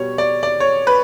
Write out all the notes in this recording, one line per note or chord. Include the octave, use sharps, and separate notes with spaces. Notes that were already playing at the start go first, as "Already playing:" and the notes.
Already playing: B2 G3 C#5
D5
D5
C#5
B4